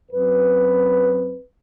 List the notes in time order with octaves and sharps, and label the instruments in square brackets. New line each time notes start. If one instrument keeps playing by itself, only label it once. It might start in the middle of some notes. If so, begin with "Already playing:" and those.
[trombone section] F#2 F#3 C4 B4